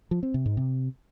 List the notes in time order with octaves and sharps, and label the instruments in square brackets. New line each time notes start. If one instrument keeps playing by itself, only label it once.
[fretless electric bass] F3
C4
C3
G#2
C3